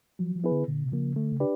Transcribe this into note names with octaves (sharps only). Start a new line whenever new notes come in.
F3 F#3
F3
B3 E4 G#4 B4
D3
A#2 D3
C3
C#3 F3 A#3
D3 A3
C#3
D4 G4 B4 D5